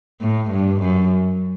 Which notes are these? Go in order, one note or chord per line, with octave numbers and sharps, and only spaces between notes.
A2
G2
F#2